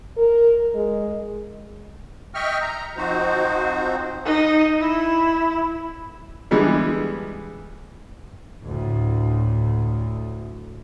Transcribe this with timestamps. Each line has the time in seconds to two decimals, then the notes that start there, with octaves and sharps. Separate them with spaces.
0.17 A#4
0.74 G#3
2.34 D#5 E5 G5 C#6 F6
2.62 A#5
2.97 F3 C4 D#4 F#4 C5
4.25 D#4
4.81 E4
6.51 D3 E3 G3 G#3 B3
8.64 D2 A2